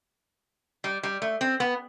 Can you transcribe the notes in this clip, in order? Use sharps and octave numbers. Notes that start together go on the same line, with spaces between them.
G3
G3
A3
C4
B3